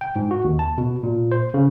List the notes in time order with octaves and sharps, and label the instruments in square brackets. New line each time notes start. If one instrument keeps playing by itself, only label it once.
[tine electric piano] G5
G#2
F#4
D#2
A5
B2
A#2
C5
C#3